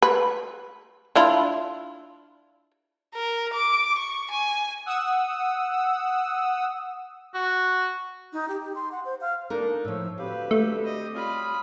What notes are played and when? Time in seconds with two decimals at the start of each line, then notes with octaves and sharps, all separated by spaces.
0.02 B4
1.15 D4 E4 F4
3.15 A#4
3.54 D6
3.99 C#6
4.31 G#5
4.86 F#5 D#6 E6
7.34 F#4
8.33 D#4
8.48 G4
8.62 G4
8.75 C6
8.92 F#5
9.05 C5
9.21 F5
9.50 D3 A#3 D4 D#4 A4 A#4
9.85 A2 F3 C#5 E6
10.18 D2 C4 G4 B4 F5
10.51 A3
10.84 D#5
11.14 G3 F4 C#5 B5 D#6